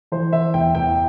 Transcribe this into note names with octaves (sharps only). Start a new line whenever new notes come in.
E3 C5
E3 E5
E2 G5
E2 G5